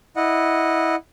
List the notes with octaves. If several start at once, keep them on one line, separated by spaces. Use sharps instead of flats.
E4 D#5 F#5